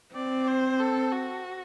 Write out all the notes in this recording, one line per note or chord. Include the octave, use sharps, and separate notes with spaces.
C4 D5
C5
A4
F#4